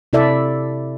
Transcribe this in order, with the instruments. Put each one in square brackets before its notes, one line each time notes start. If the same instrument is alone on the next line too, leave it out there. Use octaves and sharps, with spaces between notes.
[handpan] C3 E4 A4 D5 E5